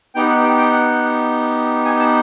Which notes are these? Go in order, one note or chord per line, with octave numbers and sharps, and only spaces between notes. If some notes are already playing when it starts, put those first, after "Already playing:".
B3 D#4 G4 G5
F#5
G5
G5
F#5
G#5
A5